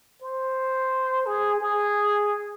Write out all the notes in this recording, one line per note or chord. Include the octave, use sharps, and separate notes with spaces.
C5
G#4
G#4